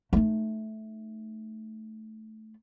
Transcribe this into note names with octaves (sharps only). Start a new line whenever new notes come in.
A3 D#4